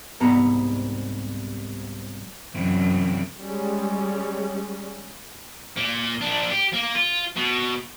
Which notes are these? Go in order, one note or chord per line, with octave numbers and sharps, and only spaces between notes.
C2 G#2 B3 A#5
F#2 C3 E3
G3 G#3 C#4
A#2 A#3
A#2 D4
G4
A#3
F4
B2